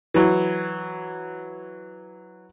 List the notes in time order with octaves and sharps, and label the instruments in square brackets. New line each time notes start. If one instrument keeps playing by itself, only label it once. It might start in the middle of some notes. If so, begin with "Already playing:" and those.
[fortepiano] E3 F#3